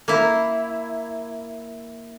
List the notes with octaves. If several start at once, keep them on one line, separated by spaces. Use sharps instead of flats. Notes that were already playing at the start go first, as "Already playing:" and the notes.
A#3 E4